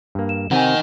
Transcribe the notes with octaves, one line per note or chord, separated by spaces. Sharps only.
G2 A#3
E7
C3 D#3 C4 F#5 G#5